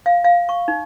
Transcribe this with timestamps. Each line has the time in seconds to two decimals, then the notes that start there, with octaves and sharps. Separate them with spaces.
0.06 F5
0.24 F5
0.49 C#6
0.68 D#4